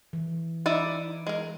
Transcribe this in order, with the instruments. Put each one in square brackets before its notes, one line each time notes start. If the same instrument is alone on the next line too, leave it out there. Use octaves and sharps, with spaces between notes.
[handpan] E3
[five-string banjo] D#4 E4 D5
G#3 A#4